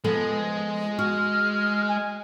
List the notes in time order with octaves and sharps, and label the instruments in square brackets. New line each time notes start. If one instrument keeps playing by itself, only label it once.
[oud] F3 B3 A4 [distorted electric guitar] G#3
[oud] F#4 [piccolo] F6
[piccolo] G#5